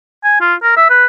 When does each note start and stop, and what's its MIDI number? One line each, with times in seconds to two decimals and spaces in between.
0.24 0.37 80
0.41 0.54 65
0.63 0.72 70
0.77 0.86 76
0.90 1.06 71